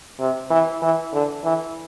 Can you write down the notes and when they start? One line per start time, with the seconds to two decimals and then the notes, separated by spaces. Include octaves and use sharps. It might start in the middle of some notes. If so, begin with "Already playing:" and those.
0.20 C3
0.50 E3
0.82 E3
1.13 D3
1.44 E3